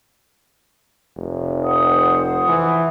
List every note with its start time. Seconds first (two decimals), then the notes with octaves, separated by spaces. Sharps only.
1.18 F1
1.64 C5 F#5 D#6
2.48 E3